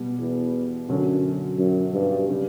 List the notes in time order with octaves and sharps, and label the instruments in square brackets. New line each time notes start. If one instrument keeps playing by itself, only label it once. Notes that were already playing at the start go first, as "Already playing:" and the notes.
Already playing: [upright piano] B2 G3 B3
[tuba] E2
[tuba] F#2 [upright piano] D3 F#3 C#4
[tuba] F#2
G2
[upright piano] C#3 G3